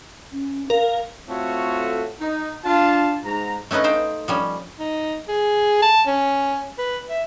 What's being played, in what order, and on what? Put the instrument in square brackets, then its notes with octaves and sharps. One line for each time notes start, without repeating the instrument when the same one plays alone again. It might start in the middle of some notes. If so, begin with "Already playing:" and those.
[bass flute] C#4
[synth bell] A#4 [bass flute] F5
[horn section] A3 C4 F4 F#4 A4 C#5
D#4
D4 F4 A5
G#2 A#5
[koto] A3 C#4 D#4 B4 D#5
D#4 C5 F5 G5
F3 G3 C#4
[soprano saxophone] D#4
G#4
A5
C#4
B4
E5